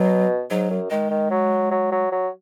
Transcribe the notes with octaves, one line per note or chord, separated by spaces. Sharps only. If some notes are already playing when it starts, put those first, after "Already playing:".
Already playing: B2 F#3
G#2 F#3
F#2
D#3 G#3
D#3
F#3
F#3
F#3
F#3